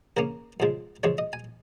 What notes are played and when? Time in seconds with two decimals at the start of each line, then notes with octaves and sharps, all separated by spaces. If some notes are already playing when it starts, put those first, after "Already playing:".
0.17 C#3 A#3 C#4 A#4
0.60 F2 C#3 F3 G#3
1.03 F2 C#3 F3 G#3 C#5
1.18 D#5
1.33 G#5